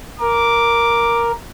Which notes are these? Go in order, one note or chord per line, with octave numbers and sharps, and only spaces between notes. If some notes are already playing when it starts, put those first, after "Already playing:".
A#4 D6